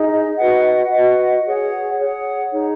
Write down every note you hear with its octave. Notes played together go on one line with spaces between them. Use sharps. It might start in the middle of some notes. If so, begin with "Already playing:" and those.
Already playing: D#4 G#4 D#5
F#4 B4 D#5 F#5
F#4 B4 D#5 F#5
G#4 C#5 F#5
G#4 C#5 F#5
D#4 G#4 C#5